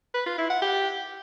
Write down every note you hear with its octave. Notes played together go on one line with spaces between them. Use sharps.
B4
F4
E4
F#5
G4